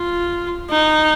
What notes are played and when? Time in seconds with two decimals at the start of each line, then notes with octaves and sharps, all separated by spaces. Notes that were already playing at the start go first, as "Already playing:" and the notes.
Already playing: F4
0.71 D#4